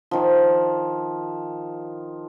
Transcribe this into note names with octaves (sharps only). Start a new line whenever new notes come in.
D#3 F3